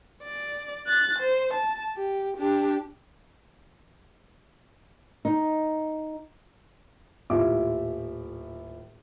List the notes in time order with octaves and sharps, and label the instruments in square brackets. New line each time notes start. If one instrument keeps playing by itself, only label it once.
[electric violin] D5
F#6 A6
C5
A5
G4
D4 G4
[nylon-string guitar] D#4
[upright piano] D#1 A2 F4 E5 D6